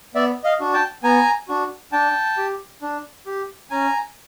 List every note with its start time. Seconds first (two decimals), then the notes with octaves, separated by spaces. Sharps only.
0.14 B3 D5 E5
0.44 D#5 F5
0.60 D4 F#4
0.73 G5 A5
1.03 B3 G#5 A#5
1.48 D4 F#4
1.92 D4 G5 A5
2.37 G4
2.81 D4
3.26 G4
3.70 C#4 G#5 A#5